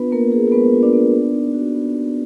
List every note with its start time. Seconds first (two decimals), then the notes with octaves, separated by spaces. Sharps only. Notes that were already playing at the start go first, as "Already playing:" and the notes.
Already playing: B3 D4 F4 B4
0.11 A#3 B3 A#4
0.32 D4 G#4
0.47 A#4
0.52 G#3 B3 B4
0.73 F4
0.82 D4 D5
0.93 B3
1.13 B3
1.33 D#4
1.54 F#4
1.75 B3
1.95 B3